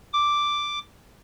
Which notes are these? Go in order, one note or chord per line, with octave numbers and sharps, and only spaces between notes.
D6